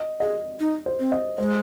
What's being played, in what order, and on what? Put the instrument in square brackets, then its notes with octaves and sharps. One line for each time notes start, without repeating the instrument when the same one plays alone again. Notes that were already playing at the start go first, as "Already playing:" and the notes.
Already playing: [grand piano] D#5
[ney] G#4 [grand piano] D#5
[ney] D#4
[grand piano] C5
[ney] C4
[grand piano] D#5
[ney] G#3 [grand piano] C5